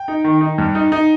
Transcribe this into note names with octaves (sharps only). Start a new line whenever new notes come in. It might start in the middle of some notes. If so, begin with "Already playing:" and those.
Already playing: G5
D#4
D#3
D#4
G2
D#4
D#4